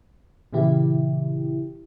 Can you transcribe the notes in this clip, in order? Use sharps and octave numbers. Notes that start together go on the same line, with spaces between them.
A#2 C#3 E3 E4 G4